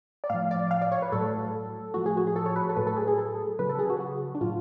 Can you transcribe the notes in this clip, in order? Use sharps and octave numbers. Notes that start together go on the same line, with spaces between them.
D5
A2 F3 F5
D5
F5
D5
C#5
B4
A2 F#3 A4
A2 F3 F#4
G#4
F#4
G#4
A4
C#5
B4
A4
A2 F#3 B4
A4
G#4
G#4
A4
C#3 F#3 B4
A4
G#4
F#4
F#4
D4
A2 F#3 F4